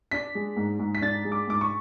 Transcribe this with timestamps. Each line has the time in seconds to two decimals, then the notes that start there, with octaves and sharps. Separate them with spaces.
0.11 D4 B6
0.35 G#3
0.56 G#2
0.79 G#2
0.95 B6
1.02 D4 A6
1.25 G#3
1.32 D6
1.47 G#2 D6
1.61 C#6